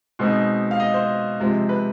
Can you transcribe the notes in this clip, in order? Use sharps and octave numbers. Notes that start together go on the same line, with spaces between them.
B2 G#3 C4 D#4
F5
D#5
C5
C3 F3 G#3 C4
B4